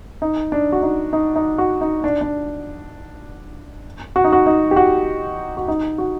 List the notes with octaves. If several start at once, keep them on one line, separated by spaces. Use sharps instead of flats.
D#4
D4
F#4
D#4
D#4
D#4
F#4
D#4
D4
D4
F#4
D#4
F#4
D#4
G4
F#4
F#4
D#4
F#4